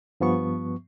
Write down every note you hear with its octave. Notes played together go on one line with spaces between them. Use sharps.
G2 F3 B3 C#6